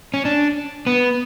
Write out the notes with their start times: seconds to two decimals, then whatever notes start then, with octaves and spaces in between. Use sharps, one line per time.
0.14 C#4
0.25 D4
0.87 B3